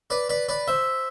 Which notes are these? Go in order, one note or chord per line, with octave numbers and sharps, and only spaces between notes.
B4 D5
B4 D5
B4 D5
C5 E5